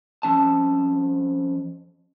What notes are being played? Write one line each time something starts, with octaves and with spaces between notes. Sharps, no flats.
F2 E3 C#4 A5